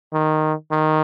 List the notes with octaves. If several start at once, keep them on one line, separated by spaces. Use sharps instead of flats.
D#3
D#3